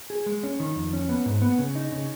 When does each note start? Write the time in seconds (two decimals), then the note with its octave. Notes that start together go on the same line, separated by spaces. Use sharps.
0.10 G#4
0.26 G#3
0.43 C#4
0.60 D#3
0.76 F2
0.93 C#4
1.09 B3
1.26 G#2
1.42 B3
1.59 C#3
1.75 D#4
1.92 C#3